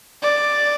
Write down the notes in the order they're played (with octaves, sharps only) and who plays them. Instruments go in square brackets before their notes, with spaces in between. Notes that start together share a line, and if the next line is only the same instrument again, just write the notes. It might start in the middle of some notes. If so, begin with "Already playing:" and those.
[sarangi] D5